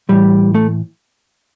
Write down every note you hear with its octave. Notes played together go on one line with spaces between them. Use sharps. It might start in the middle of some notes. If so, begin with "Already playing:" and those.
A2 E3 G3
A3